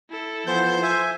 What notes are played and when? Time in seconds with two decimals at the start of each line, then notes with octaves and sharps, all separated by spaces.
0.10 E4 A4
0.47 E3 F3 B3 C5 G6
0.82 E5 G#5